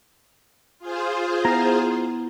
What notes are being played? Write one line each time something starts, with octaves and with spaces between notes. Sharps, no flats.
F4 G#4 C5
B3 E4 A#5